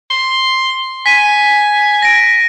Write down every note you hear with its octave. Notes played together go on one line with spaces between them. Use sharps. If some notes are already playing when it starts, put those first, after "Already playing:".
C6
G#5 B6 D#7
A#6 D7